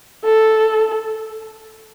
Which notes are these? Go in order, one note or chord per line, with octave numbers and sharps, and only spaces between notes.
A4